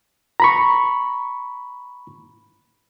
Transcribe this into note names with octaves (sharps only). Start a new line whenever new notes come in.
A#5 B5 C#6